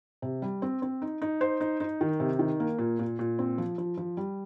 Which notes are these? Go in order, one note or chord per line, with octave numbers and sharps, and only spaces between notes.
C3
G3
C4
C4
D#4
D#4
C5
D#4
D#4
D#3
C3
D#3
A#3
A#2
A#2
A#2
C4
F3
F3
F3
G3